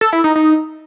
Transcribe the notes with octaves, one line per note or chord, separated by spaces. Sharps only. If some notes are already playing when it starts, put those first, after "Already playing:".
A4
E4
D#4
D#4